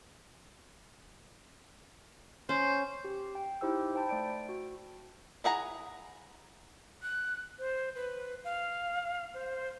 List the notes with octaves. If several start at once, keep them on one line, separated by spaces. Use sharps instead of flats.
C#4 C5
G4
G5
D#4 E4 G4 C5 G5 E6
C5 G5 A5 B5
A3 D5 D7
F#4
E4 G#4 F#5 A#5
F#6
C5
B4
F5
C5